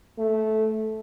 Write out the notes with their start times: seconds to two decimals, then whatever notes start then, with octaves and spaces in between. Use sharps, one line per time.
0.18 A3